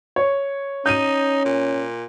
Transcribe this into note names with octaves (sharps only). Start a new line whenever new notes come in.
C#5
C#4 D#4 G6 D#7
A#2